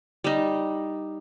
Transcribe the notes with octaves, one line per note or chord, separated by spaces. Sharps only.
G3 D#4